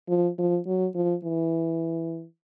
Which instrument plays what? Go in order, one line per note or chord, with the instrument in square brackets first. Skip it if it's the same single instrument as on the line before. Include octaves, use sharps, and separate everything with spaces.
[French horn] F3
F3
F#3
F3
E3